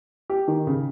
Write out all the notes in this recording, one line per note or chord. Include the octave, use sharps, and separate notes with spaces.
G4
D#3
C#3